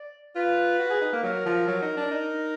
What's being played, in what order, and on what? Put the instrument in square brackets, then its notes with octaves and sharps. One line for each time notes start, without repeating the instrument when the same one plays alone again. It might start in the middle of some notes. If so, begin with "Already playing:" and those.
Already playing: [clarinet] D5
[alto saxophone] F4 [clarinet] B4
[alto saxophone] F#4
G#4
D#4
A#3
[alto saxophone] F#3 [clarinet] A#4
[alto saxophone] F3
F#3
D#4
D4
D#4